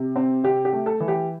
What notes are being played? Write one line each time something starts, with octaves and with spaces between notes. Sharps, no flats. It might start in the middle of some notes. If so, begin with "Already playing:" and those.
Already playing: C3
C4
C3 G4
G4
A3
A4
E3
G4